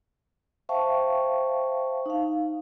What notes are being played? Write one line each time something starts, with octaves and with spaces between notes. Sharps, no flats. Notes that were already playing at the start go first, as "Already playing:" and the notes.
C5 E5 F5 G5 A5 C#6
D#4 F5